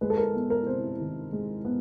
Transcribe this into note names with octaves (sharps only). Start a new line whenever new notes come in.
G#3 B4
A4
A#4
B3
A#4
C3 C5
D#3
G#3
B3